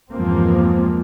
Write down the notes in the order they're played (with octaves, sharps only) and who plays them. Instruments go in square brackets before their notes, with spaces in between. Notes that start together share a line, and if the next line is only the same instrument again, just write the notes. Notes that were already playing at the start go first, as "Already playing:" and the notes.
[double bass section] E2 G2 F3 G#3 A#3 C4